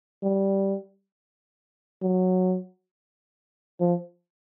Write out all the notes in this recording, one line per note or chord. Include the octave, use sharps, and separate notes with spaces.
G3
F#3
F3